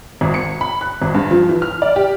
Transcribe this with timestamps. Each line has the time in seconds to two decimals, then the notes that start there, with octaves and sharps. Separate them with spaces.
0.21 G#1
0.34 C#7
0.61 B5
0.81 F#6
1.02 G#1
1.15 G2
1.31 F3
1.49 E3
1.62 F6
1.82 D5
1.96 G4